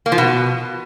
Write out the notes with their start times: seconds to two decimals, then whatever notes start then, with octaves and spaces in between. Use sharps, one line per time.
0.06 A#3
0.12 F3
0.18 B2